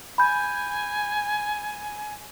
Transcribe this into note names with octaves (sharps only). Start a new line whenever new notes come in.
G#5 B5 G6